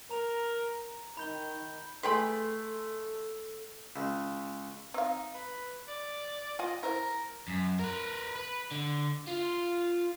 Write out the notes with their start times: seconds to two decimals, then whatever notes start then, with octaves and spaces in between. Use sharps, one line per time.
0.11 A#4 A#5 F7
1.17 D#3 B5 G6 G7
2.03 A3 G#4 A4 B4 G5 B5 C6
3.96 C#2
4.94 C4 D#4 F5
5.34 B4
5.88 D5
6.59 F4 D#5 G#5
6.83 E4 A#4 C5
7.48 F#2
7.79 A#4 B4
8.36 B4
8.72 D3
9.28 F4